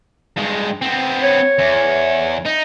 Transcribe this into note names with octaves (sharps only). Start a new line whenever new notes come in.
G2 G#3
B3 C4
C#5
E2
D#4